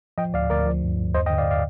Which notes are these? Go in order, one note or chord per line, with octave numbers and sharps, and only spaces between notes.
F3 D#5 G5
D2 D5 F5
D2 A#4 D5
F3
G2
G2
D#2 C5 D#5
D#5 G5
D3
D5 F5
D5 F5